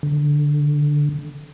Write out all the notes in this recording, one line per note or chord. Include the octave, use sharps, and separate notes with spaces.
D3